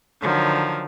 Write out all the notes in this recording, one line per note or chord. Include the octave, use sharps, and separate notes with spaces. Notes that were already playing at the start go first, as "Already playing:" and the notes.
D3 D#3 F3 F#3